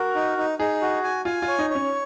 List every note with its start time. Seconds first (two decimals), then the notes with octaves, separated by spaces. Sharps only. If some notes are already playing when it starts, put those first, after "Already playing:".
Already playing: F#4 A#4
0.15 D#4
0.37 D#4
0.59 D#4 G#4
0.82 F#4
1.04 G#5
1.25 F4 G#5
1.42 F4
1.48 C#5
1.59 D#4
1.70 C#5
1.75 C#4